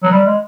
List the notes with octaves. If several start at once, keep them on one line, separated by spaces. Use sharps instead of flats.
F#3
G3
G#3